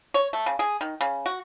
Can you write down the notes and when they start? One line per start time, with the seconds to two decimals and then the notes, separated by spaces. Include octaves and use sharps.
0.14 C#5
0.33 A3
0.46 C#3
0.59 G#4
0.81 D#3
1.01 C#3
1.26 F#4